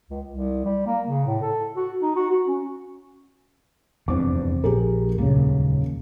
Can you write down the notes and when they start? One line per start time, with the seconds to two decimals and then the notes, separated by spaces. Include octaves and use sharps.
0.10 C#2
0.27 C2
0.65 G3
0.86 A#3
1.07 C#3
1.26 A2
1.42 A4
1.76 F#4
2.02 D#4
2.16 F#4
2.30 F#4
2.48 C#4
4.08 F1 E2 G2 C4 D6
4.64 A#1 G4 G#4 A#4
5.18 D#1 C#2 F#2 C#3 A#3